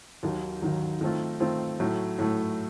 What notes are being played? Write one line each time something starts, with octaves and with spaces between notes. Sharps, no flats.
D#2 D#3 F#3
D#2 D#3 F#3
D#3 A3 C4 F4
D#3 A3 C4 F4
A2 F#3 A3
A2 F#3 A3